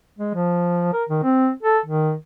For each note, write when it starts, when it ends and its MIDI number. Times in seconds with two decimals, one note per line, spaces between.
0.19 0.33 56
0.35 0.92 53
0.93 1.04 70
1.09 1.21 51
1.24 1.50 60
1.63 1.79 69
1.86 2.14 51